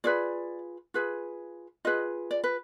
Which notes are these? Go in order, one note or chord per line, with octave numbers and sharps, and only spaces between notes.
F4 G#4 B4 D5
F4 G#4 B4
F4 G#4 B4 D#5
D5
B4